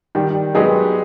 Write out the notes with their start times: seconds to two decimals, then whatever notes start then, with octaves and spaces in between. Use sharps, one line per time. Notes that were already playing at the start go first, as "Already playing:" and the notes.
0.15 D#3 G3 G4
0.55 F#3 G#3 B3 D#4 G4 G#4